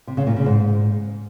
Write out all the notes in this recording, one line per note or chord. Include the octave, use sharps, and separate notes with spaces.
C3
C#3
A#2
C#3
G#2